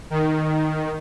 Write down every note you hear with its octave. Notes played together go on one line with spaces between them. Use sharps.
D#3